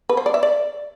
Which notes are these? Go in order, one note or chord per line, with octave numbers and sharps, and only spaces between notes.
B4
C5
D5
E5
D5